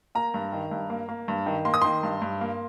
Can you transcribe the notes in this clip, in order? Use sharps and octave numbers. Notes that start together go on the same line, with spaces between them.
A#3 A#5
G2
D#3
G2
A#3
A#3
G2
D#3
A#3 C6
D#6
D#3 C6
G2
G2
A#3